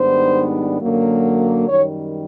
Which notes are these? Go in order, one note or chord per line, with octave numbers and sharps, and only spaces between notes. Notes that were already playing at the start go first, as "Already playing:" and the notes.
Already playing: G#2 D#3 G3 B3 D4 C5
F#2 D3 F#3 A#3
F#2 D#3 G3 C#5